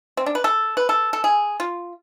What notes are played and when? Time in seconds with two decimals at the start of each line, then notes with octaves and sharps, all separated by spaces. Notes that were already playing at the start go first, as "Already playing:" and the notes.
0.17 C4
0.26 D4
0.35 B4
0.44 A4
0.77 B4
0.89 A4
1.13 A4
1.24 G#4
1.60 F4